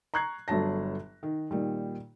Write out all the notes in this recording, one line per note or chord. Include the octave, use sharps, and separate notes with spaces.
A#5 C#6 F#6 G#6 C7
G1 D3 F#3 A5 A#6
D#3
A#2 D#3 G3